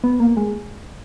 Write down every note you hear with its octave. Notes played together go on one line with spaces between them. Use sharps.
B3
A#3
G#3